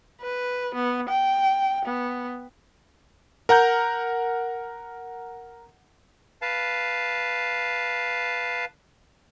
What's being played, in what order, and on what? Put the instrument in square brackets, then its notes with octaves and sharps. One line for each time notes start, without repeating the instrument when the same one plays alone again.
[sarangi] B4
B3
G5
B3
[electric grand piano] A#4 F#5 A#5 G6
[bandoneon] B4 F5 A5